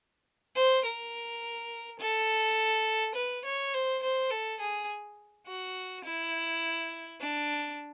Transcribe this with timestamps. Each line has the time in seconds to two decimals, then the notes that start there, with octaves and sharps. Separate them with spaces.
0.55 C5
0.85 A#4
2.00 A4
3.15 B4
3.45 C#5
3.74 C5
4.03 C5
4.31 A4
4.61 G#4
5.47 F#4
6.05 E4
7.21 D4